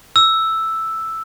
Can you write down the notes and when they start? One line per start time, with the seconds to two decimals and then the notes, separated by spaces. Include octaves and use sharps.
0.16 E6